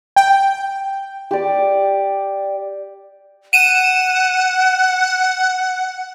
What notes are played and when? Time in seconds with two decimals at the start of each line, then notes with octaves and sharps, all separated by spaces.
0.16 G5
1.31 G4 D5
3.53 F#5 D#7 E7